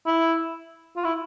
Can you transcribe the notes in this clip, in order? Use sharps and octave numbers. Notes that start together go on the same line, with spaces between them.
E4
F4
E4